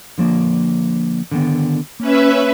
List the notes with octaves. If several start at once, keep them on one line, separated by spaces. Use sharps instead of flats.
D3 F3 A#3
D3 D#3 B3
A#3 C#4 B4 E5